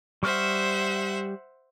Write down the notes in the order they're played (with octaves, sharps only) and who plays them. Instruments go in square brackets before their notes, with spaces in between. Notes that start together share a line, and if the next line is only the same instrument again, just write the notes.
[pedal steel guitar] G3 C#6 F6 [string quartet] C5 E5 F#5